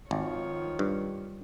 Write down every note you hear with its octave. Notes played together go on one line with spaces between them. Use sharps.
G#1 D#3 F3 C#5
G2